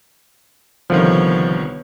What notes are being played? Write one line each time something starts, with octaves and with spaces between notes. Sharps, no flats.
C2 D3 D#3 F3 B3 C#5